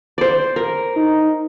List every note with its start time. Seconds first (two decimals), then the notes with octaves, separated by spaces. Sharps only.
0.18 C5 D5
0.56 A#4
0.96 D#4